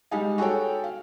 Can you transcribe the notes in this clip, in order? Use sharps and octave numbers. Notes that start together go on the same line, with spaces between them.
G3 G#3 D#4 G#4 F5
F#4 G#4 A4 C#5 G5
F5